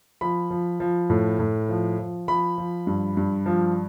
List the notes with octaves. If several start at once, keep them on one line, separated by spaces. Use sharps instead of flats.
F3 B5
F3
F3
A2
A2
F3
F3
F3 B5
F3
G2
G2
F3